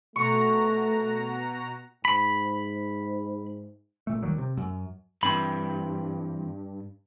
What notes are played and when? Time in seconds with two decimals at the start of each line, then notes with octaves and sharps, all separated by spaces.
0.16 B2 A3 F#4 A#5 C#6
2.05 G#2 B5
4.07 F1 A#2 A3
4.23 D#2 D#3 F#3 G3
4.38 C3
4.57 F#2
5.23 G2 E3 C4 B5